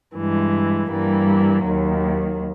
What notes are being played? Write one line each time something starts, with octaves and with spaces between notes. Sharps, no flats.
G2 E3 G#3
G2 E3 G3 A#3
D#2 D#3 F#3